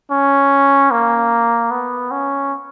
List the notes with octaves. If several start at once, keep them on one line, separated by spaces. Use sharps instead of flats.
C#4
A#3
B3
C#4